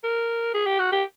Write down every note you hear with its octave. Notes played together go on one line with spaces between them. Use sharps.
A#4
G#4
G4
F#4
G4